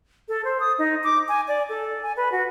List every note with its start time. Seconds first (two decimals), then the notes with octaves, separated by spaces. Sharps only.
0.29 A4
0.45 C5
0.60 D#6
0.78 D#4
1.04 D6
1.28 G#5
1.48 D5
1.69 A4
2.03 G#5
2.17 B4
2.32 F#4